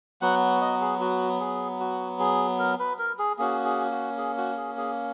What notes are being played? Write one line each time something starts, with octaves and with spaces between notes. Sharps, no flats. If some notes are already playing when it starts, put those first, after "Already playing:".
F#3 B3 F#4 F#5
D#5
G#4
F#4
G#4
F#4
G#4
A#4
B4
A#4
G#4
A#3 C#4 F#4 G#4
G#4
F#4
G#4
F#4
G#4
G#4